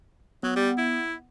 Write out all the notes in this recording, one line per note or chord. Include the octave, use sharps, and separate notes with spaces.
F#3 B3
G3
E4